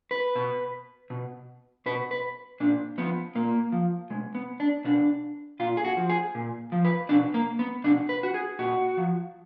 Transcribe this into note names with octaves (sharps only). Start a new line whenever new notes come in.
B4
B2
B2
B2 B4
B4
A#2 D4
F3 B3
A#2 A#3
F3
B2 G#3
B3
D4
B2 D4
A#2 F4
G#4
F#4
F3
G#4
A#2
F3
B4
B2 D4
A#3
B3
B2 D4
B4
F#4
G#4
A#2 F#4
F3